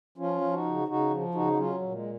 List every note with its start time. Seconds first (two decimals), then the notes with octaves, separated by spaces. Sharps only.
0.18 F3 C#4 F4
0.41 F3
0.53 D#4 F#4
0.65 C#3
0.88 C#3 D#4 F#4
1.11 F3
1.34 C#3 D#4 F#4
1.53 F#4
1.57 F#3 C#4 F4
1.81 A#2
1.92 G#3